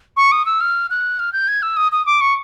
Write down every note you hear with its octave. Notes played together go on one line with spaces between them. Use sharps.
C#6
D#6
E6
F6
F#6
F6
G6
G#6
E6
D#6
D#6
D6
C#6